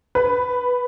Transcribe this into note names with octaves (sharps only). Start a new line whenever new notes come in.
B4